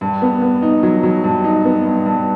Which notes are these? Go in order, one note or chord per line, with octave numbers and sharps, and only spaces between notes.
G2
B3
B3
D#4
F#3
F#3
G2
D#4
B3
G2
G2